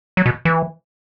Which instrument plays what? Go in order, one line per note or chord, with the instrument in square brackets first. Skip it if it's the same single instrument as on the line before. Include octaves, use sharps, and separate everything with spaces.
[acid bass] F#3
B2
E3